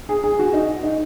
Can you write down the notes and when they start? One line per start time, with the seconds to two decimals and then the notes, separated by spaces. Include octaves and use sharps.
0.09 G#4
0.24 G#4
0.39 F#4
0.53 D#4
0.83 D#4